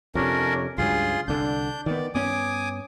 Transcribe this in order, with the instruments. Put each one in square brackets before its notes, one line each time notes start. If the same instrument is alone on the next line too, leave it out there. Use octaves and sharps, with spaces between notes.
[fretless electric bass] F2 C3 [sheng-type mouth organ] C#4 D4 A#4
[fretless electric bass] C#2 G2 F#3 [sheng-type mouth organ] F4 G#4 C6
[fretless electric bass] C2 D3 [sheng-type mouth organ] D4 G6
[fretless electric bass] D#3 B3 [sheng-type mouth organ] D5
[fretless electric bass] G2 B3 C#4 [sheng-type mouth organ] G#5 D6 D#6